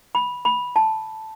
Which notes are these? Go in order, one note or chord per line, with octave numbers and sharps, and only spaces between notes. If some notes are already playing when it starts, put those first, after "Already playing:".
B5
B5
A5